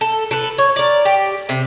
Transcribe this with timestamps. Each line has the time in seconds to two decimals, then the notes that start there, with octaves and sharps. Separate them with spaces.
0.01 A4
0.31 A4 B4
0.58 C#5
0.76 A#4 D5
1.05 G4
1.49 C3